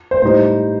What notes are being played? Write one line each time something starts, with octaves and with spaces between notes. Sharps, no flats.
C5
A2 G3 D#4 C5